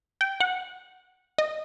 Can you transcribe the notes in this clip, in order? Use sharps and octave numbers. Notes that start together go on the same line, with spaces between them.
G5
F#5
D#5